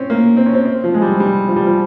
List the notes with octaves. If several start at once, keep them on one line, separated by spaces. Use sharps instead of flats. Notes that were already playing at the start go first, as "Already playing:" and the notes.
Already playing: C4 C#4
A#3
C4
C#4
C4
C4
F3
G#3
G3
G3
F3
G3
F3